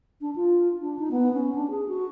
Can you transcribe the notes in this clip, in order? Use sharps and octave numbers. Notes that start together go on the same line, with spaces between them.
D4
F4
D4
D#4
B3
C#4
D4
G#4
F#4